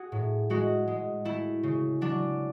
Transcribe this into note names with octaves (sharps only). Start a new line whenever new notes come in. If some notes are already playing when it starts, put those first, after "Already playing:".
Already playing: F#4 G#4
A2
G#3 F#4
G#3
A3 E4
C#3
F#3 D4